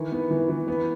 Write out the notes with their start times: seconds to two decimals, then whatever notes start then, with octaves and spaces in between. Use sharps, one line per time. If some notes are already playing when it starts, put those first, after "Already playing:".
Already playing: D#3 E3
0.12 B3
0.31 E3
0.49 E3
0.68 B3